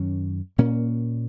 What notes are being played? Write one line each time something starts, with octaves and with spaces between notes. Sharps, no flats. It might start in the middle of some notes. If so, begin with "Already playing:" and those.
Already playing: F#2 D#3 F#3 C#4
A#2 A#3 C#4